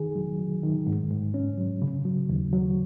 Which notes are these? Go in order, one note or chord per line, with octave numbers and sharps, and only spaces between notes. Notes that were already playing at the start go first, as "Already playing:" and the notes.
Already playing: D#3 G#4
F#3
F#3
D#3
G#2
G#2
C#4
F#3
C#3
F#3
D#2
F#3